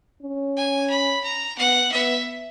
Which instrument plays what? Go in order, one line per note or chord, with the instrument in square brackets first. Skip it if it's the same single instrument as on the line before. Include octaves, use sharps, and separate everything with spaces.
[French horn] C#4
[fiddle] G#5
B5
A#5
[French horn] B3 [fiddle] F#5
[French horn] B3 [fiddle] E5